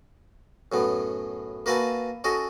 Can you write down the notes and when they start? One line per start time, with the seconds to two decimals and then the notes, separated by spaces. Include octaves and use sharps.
0.72 F#2 A2 B3
1.66 A#3 F#4 B4 E5 G#5 A5
2.24 C#4 F#4 A4 D#5